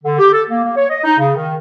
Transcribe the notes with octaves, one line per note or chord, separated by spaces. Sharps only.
D3
G4
A4
A#3
A#3
C#5
D#5
D#4
C#3
D#3